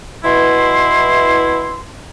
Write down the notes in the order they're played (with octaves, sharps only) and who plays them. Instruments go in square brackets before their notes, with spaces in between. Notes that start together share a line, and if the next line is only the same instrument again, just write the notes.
[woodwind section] B2 E3 E4 C6